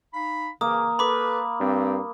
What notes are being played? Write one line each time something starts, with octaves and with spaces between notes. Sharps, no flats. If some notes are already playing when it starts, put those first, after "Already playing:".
D#4 F5 B5
C#3 E3 A#3 D#6
A4 B4 B5 D6
G2 C4